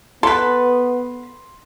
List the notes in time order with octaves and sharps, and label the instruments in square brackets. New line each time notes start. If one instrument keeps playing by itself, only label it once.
[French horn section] B3 [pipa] A4 B4 [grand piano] C6